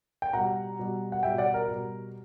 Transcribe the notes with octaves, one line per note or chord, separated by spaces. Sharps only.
G5
B2 G3 F#5 A#5
B2 G3
F#5
B2 G3 E5 G5
D5 F#5
A#4
B2 G3